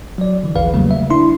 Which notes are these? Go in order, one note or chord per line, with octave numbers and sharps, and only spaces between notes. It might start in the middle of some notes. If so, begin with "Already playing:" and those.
F#3 D5
D3 E3
A#1 E2 E3 B4 F5
C#3 F#3 G3 A3 A#3
E5
D4 E4 C6